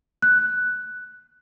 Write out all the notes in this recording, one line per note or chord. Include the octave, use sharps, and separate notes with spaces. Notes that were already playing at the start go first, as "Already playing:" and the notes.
F#6